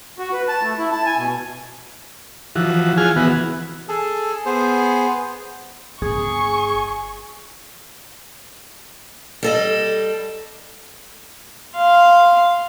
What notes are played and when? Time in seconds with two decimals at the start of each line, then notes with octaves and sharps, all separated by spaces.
0.19 F#4
0.32 B4
0.48 A5
0.62 A3
0.78 E4
0.91 A5
1.06 G#5
1.18 B2
2.55 E3 F3 F#4
2.98 F4 G#4 G#5 F6
3.16 E3 B3 F#4
3.88 G#4 A4
4.46 B3 G#4 C5
6.02 G1 G#4 C#6
9.43 G3 A4 D#5
11.76 F5 C6